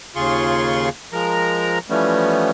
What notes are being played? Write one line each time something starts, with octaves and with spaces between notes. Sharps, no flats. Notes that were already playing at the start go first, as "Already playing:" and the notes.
D#2 C#3 F4 G#4 C6 C#6
F3 G#3 A#4 A#5
E3 F3 G3 A3 B3 C#4